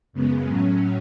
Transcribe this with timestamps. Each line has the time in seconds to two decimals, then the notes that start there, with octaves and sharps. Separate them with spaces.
0.13 F#2 C#3 G#3 B3
0.48 A2 F#3 C#4